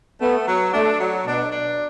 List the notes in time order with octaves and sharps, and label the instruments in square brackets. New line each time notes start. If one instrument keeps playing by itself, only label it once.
[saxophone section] A3 [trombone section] B3
[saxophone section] F#3
[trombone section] A3 [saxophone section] D4
[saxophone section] F#3
[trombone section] B2 [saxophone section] D4
[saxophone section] D4